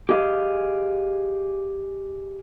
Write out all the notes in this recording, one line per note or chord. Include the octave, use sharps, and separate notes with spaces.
G4 G#4 D#5 F5